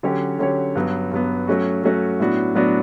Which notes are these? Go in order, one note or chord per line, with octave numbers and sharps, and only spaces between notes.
D3 F#3 C#4 G4 C#5
D3 F#3 C#4 G4 C#5
G2 F#3 B3
G2 F#3 B3
F#3 A3 C#4 F#4
F#3 A3 C#4 F#4
A2 F#3 B3 D4 F#4
A2 F#3 B3 D4 F#4